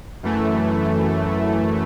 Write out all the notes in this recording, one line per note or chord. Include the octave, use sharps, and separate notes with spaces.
F#2 E3 A3